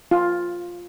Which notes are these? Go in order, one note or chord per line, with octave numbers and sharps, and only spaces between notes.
F4